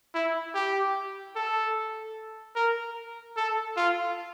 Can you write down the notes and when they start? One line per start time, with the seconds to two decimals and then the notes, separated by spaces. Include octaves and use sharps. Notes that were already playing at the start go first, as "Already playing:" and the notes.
0.15 E4
0.54 G4
1.36 A4
2.56 A#4
3.37 A4
3.77 F4